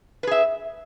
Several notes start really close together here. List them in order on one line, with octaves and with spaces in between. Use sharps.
B4 G#4 E5